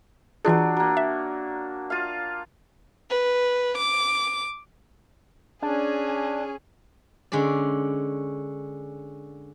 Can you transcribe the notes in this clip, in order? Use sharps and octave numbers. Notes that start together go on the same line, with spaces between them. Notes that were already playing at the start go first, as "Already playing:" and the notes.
E3 F#3 D4 F4 G#4
F#3 A#3
E5
F4 F5
B4
D6
C#4 D4 G#4
D3 G#3 C#4 D5